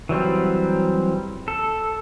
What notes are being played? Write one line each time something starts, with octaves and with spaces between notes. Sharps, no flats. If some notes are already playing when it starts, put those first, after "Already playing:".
E3 F#3 G3 C4
A4